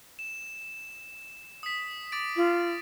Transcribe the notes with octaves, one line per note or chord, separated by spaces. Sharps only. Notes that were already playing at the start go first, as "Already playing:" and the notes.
E7
D#6 B6
D6 A6 D7
F4